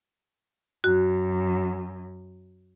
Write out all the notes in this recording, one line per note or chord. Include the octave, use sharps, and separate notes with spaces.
F#2 F#4